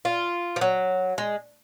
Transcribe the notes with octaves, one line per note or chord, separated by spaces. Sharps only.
F4
F3
F#3
G#3